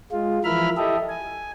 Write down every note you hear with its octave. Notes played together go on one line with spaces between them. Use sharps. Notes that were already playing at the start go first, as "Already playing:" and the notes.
G#3 F4
E3 F3 A#4 E5 B5 F6
E4 G4 A4 D#5 E5
G#5